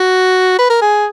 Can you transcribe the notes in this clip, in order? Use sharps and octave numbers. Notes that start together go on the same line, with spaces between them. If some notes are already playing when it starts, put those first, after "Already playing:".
Already playing: F#4
B4
A#4
G#4